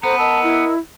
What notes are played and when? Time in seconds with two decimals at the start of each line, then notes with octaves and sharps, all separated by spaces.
0.03 B3 A4 C5 A#5
0.18 A#4 D#5 A5 E6
0.43 E4